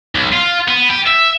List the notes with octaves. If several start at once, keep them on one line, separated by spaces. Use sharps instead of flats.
B1
F4
B3
G4
E5